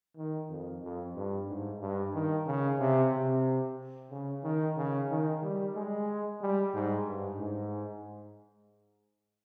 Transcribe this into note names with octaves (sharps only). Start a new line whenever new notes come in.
D#3
F2
F2
G2
G#2
G2
D#3
C#3
C3
C3
C#3
D#3
C#3
D#3
G3
G#3
G3
G#2
G2
G#2